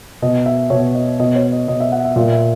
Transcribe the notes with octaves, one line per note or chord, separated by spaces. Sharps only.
B2 D#5
E5
B2 C#5
D#5
B2 D#5
C#5
D#5
B2 D#5
E5
F#5
E5
A#2 E5
E5